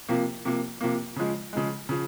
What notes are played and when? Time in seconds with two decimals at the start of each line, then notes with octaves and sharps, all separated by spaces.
0.09 C3 F3 A#3
0.45 C3 F3 A#3
0.81 C3 F3 A#3
1.16 C#3 F3 G#3
1.53 C#3 F3 G#3
1.89 C#3 F3